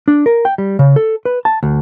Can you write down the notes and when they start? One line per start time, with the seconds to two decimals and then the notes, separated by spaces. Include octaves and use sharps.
0.08 D4
0.26 A#4
0.45 G5
0.58 G3
0.79 C#3
0.96 A4
1.25 B4
1.45 A5
1.63 D2